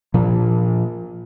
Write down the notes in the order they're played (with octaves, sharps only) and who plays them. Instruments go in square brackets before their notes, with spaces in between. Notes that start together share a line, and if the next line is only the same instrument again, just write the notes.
[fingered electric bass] A#2 F3 A#3